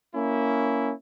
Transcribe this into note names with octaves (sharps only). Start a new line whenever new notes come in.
A#3 C#4 E4